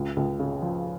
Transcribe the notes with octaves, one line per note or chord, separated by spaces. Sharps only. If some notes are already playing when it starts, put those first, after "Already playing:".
Already playing: C#2
C#2
C#3
F3